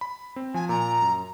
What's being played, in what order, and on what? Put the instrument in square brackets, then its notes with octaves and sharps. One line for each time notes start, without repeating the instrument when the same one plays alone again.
[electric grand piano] B5
C4
[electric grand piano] F3 [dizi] G#5
[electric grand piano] A#2 [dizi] A#5
[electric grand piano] F#2